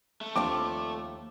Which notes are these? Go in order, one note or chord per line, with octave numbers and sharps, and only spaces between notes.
A3
D#2 F3 C4 D4 F4 D6